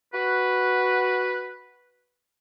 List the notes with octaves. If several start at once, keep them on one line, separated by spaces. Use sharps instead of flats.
F#4 B4